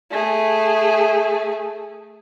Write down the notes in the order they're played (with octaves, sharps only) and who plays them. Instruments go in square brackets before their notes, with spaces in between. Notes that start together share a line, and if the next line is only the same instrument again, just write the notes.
[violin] A3 G#4